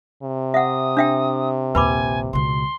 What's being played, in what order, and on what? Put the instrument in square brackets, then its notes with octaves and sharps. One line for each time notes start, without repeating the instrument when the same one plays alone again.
[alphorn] C3
[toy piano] E5 F#5 [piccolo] D#6
[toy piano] D4 E5 G5
[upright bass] A#1 D#2 [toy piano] B4 B5 D6 [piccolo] G#5
[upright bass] C#2 B2 [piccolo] C6